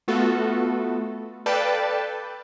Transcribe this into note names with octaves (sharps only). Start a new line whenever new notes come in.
A3 B3 F4 F#4 A4
A4 B4 D5 F5 G5 A5